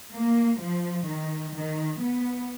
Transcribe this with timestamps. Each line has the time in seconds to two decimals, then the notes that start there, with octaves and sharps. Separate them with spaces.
0.13 A#3
0.60 F3
1.07 D#3
1.55 D#3
2.01 B3